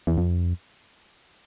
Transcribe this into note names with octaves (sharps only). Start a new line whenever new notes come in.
E2
F2